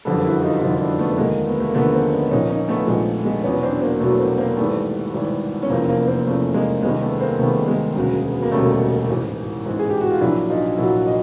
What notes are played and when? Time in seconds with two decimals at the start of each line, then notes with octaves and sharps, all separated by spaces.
0.05 F#1 F2 D3 G3 A4 B4
0.24 E4 F#4
0.43 D#4 F4
0.62 F#1 F2 D3 G3 D#4 F4
0.80 D4 E4
0.99 A3 B3
1.18 D#2 D3 F3 G#3 A#3
1.46 A3 B3
1.60 A3
1.68 A#3
1.74 D#2 D3 F3 A3 B3
1.93 A#3 C4
2.12 B3 C#4
2.31 A#1 A#2 F3 C#4 D#4
2.49 C#4 D#4
2.68 A3 B3
2.87 A#1 A#2 F3 G#3
3.25 G#3
3.44 E2 B2 F#3 B3 C#4
3.63 C4 D4
3.82 A#3 C4
4.00 E2 B2 F#3 A3 B3
4.19 A#3 C4
4.38 A#3 C4
4.56 G#1 G#2 E3 G3 A3 B3
5.14 G#1 G#2 E3 G3
5.63 C#4
5.69 F1 E2 C#3 F3 A#3 C4
5.88 A#3 C4
6.00 B3
6.07 A#3 C4
6.26 F1 E2 C#3 F3 A3 B3
6.54 G#3 A#3
6.83 C#2 C3 D#3 G3 G#3
7.01 A3 B3
7.20 A#3 C4
7.39 C#2 C3 D#3 G3 A3 B3
7.68 G#3 A#3
7.95 E1 D2 C#3 F#3
8.32 B3
8.42 A#3
8.52 E1 D2 C#3 F#3 G3 A3
9.09 A1 G#2 E3
9.66 A1 G#2 E3
9.79 G#4
9.90 G4
10.00 F#4
10.11 F4
10.21 A#1 A#2 F#3 D4 E4
10.50 D#4 F4
10.78 A#1 A#2 F#3 E4 F#4
11.06 D#5